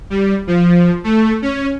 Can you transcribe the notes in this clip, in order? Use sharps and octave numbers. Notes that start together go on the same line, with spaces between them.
G3
F3
A3
C#4